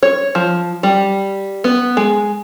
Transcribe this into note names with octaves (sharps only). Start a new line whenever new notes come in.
C#5
F3
G3
B3
G#3